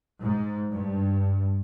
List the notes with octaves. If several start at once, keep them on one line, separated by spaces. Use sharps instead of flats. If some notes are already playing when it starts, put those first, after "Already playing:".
G#2
G2